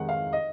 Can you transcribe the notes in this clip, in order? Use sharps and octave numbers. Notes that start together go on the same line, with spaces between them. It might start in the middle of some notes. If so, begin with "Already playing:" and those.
Already playing: F2 D#3 G#3 D#4 F#5
F5
D#5